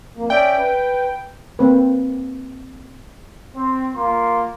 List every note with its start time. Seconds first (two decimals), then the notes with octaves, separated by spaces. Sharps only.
0.17 F2 A#3
0.30 C#4 D5 E5 G5
0.58 B4
1.59 A#3 C4 B4
3.55 C4
3.93 A#3 F4 C6